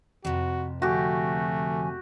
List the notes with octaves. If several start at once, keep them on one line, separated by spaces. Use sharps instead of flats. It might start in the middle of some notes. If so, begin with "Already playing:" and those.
F2 C3 F#4
D3 F3 A3 F#4 G4 G#5